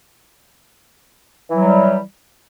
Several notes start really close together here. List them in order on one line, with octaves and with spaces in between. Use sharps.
E3 F#3 G3